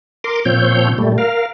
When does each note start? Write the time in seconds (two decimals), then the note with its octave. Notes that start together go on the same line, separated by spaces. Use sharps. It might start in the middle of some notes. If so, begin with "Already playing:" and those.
0.24 A#4 C6 D6
0.45 A#2 F3 C4 C#5 G6
0.98 A#2 G3 A3
1.18 A#4 F5